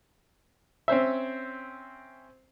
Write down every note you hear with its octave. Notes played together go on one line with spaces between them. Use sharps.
C4 C#4 C5 E5